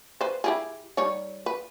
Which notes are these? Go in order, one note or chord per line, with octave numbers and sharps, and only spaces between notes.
B4 C5
E4 G4 G#4
G3 D#4 C#5
B4